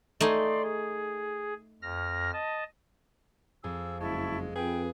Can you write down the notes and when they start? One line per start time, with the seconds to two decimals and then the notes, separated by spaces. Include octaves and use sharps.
0.21 A3 D#4 D5 G#5 C6
0.63 G#4
1.82 F2 F6 A#6
2.33 D#5 A5
3.64 F2 G#4 E6
4.01 F#1 G#3 E4 A5 C#6
4.56 F2 G#4 B4 G5